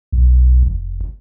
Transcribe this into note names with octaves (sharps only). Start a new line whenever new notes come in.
B1
F1